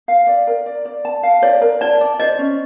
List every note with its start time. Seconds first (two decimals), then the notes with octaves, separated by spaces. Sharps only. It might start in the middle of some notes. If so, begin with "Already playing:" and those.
0.08 F5
0.27 D5
0.47 A#4
0.66 D5
0.85 D5
1.05 A5
1.23 F5
1.42 C#5 D5
1.61 A#4
1.81 D5 A5
2.01 D5
2.20 C5 D#5
2.39 C#4